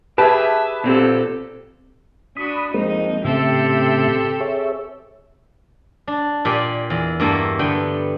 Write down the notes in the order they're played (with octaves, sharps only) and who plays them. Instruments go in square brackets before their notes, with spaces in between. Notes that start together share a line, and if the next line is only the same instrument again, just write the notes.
[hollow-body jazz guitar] G4 G#4 [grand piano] B4 [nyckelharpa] E5 [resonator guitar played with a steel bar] A5
[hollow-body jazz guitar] A#2 C4 [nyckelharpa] G4 A4
[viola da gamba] D4 F#4 [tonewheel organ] B5 D#6
[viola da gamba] F2 D#4 [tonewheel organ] G#3 A#3 C4
[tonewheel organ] A2 C#3 E5 [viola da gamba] C4 G4 A4
[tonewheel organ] G#4 C#5 E5
[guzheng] D4
A#2 G4 D5 G#5
E2
G2 A#3 E4 F#4 A4
D3 B3 G5